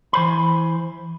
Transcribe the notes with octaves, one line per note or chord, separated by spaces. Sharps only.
E3 C5 B5